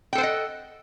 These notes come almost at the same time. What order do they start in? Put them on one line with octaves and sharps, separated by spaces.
G5 A4 C5 F#5 D#5